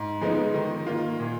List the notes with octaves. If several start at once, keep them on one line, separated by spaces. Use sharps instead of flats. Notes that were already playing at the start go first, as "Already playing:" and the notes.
Already playing: G#2
F3 G#3 B3 D#4
D#3
A#3 F4
A#2